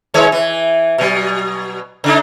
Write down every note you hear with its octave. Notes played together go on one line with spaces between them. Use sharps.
D#3 G#3 C#5
E3
B2 F#3
C#3 D4 D#4